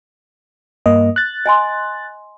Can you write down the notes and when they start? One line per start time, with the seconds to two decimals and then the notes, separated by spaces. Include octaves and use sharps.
0.86 G2 A#3 D#5
1.16 F#6 A6
1.46 D#5 G#5 C6